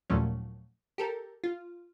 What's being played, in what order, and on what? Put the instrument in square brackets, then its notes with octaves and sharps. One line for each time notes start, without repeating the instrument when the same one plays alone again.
[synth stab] D#2 A#2 F3 F#3 A3 C#4
G4 A4 A#4
F4